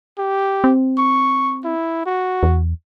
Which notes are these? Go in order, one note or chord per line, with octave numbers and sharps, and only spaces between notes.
G4
C4
C#6
E4
F#4
E2